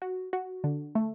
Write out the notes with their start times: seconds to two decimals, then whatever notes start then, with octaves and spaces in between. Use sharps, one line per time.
0.02 F#4
0.33 F#4
0.64 D3
0.95 A3